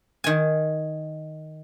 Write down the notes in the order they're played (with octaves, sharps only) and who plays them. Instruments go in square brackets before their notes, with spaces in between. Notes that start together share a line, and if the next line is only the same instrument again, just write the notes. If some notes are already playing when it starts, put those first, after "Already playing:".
[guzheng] D#3 G#5